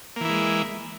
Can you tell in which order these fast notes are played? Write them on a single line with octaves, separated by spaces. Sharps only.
A#3 E3 E4 G#3